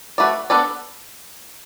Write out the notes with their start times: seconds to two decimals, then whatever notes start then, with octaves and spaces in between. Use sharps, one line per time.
0.18 A3 F#4 B4 D5
0.50 B3 D4 A4 D5